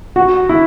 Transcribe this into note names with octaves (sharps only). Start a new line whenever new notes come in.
F#4
E4